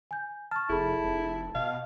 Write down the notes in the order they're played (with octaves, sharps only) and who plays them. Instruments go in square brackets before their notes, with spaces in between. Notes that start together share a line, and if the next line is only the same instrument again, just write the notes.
[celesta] G#5 G6
[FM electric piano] A5 [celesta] C#6 F6
[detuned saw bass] F1 [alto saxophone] E4 [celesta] G#4 A4 B5
[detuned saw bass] F1
[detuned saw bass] B2 [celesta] D#5 [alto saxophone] F5